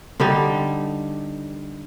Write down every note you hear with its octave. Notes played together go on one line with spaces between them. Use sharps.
D3 G3 D#4